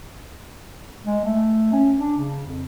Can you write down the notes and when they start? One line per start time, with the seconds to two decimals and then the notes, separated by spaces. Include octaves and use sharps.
1.05 G#3
1.25 A3
1.72 C#4
1.99 D4
2.18 C#3
2.46 F2